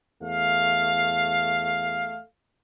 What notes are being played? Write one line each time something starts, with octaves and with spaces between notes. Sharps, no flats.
E2 A3 F5